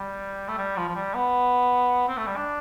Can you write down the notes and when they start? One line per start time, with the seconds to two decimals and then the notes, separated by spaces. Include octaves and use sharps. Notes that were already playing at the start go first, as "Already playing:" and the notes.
Already playing: G3
0.48 A3
0.57 G3
0.77 F3
0.88 F3
0.95 G3
1.14 B3
2.08 C4
2.17 A3
2.27 G3
2.37 D4